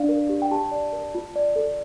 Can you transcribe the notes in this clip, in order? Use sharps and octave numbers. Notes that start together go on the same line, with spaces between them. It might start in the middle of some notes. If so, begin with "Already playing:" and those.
Already playing: D4 D5 F5
A#4
G4
G5
G4 A5
D5
A#4
F4
D5
A4